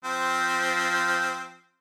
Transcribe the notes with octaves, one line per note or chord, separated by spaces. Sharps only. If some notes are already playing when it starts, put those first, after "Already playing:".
F3 C4